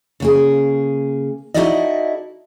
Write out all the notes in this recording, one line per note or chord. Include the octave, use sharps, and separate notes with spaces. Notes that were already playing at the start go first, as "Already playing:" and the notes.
C#3 A#3 G#4
D#4 E4 F#4 A4 D5 D#5